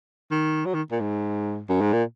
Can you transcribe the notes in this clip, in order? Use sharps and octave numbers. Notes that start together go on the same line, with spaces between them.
D#3
F#3
D#3
A#2
G#2
F#2
G#2
A#2